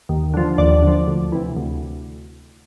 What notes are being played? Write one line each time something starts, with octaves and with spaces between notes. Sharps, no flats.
D#2
D3 F3
D#2 D5
D3 F3
D2
C3 E3
D2